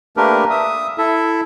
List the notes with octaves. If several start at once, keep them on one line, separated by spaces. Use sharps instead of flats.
A3 A#3 D4 G4 A#4 B4
E5 D#6
E4 A4 E5